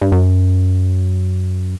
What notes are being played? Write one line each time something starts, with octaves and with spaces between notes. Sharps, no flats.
G2
F#2